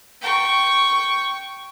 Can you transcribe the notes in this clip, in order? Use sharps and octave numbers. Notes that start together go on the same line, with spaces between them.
G5 C#6